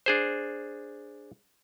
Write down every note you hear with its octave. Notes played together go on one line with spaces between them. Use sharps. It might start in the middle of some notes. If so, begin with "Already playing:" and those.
D4 G#4 C5